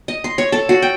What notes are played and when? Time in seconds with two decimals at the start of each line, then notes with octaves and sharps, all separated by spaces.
0.08 D#5
0.24 C6
0.38 C#5
0.52 A4
0.69 F#4
0.82 G5